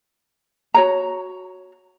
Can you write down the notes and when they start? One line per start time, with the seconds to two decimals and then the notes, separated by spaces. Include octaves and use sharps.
0.74 F#4 C#5 A#5